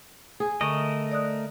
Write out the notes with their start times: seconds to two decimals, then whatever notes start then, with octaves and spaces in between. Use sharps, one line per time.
0.40 G#4
0.61 D3 A3 A#4 D#5 C#6
1.12 D5 D#6 F#6